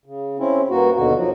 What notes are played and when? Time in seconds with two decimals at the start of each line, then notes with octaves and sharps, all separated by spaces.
0.06 C#3
0.39 C4 C#4 E4
0.69 G2 A#3 F#4
0.95 D#2 B2 D3 F#4
1.15 F3 F#3